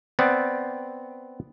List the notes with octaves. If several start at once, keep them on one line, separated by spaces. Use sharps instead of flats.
B3 C4 D5